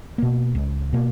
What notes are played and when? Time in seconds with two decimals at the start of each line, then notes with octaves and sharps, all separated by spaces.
0.18 B2 A#3
0.55 C#2
0.93 B2 A#3